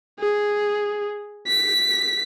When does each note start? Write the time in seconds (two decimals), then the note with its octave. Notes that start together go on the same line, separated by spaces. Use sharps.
0.20 G#4
1.47 B6